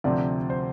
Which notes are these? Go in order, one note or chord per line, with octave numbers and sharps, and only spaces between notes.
D2 C3 F3 C4 D5
C5